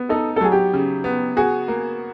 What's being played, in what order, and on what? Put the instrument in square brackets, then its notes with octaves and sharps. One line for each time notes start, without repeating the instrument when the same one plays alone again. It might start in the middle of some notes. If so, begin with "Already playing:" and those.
Already playing: [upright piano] B3
[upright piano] D#4 [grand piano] A4
[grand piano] A4
[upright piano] F#3 [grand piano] G#4
[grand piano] G4
[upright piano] C#3
B3
[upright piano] F#4 [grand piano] G#4
[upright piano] A#3